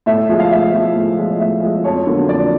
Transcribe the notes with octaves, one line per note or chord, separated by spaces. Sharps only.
A2 E5
F3 G#3
F5
A2 E5
F3 G#3
A2
F3 G#3
D#5
A2 E5
F3 G#3
F2 C#5
D3 F#3 A#3
F2 D5